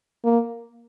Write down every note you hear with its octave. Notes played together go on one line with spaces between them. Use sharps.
A#3